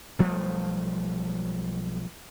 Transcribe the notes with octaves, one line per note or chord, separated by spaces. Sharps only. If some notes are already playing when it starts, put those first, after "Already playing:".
B1 F3 G3 A3